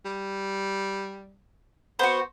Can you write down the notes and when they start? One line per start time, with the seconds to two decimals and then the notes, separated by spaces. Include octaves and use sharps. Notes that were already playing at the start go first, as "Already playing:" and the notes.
0.05 G3
1.99 B3 F#4 C5